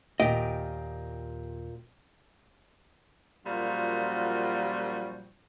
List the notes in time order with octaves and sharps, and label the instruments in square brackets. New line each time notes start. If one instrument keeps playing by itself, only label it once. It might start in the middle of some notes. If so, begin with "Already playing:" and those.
[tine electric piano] D#2 [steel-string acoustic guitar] A#2 C4 [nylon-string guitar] G4 G5 [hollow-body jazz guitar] D#5
[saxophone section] F#2 A#2 F3 G3 F4 F#4